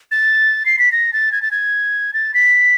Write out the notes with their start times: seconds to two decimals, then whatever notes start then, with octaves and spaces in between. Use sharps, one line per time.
0.11 A6
0.66 C7
0.79 B6
0.92 A#6
1.13 A6
1.32 G#6
1.42 A6
1.51 G#6
2.13 A6
2.34 B6